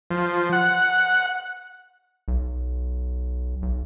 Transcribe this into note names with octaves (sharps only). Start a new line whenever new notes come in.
F3
F#5
B1
B1